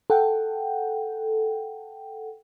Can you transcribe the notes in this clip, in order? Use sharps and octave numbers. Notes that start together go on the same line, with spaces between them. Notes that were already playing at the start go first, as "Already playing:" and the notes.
A4 F#5 G5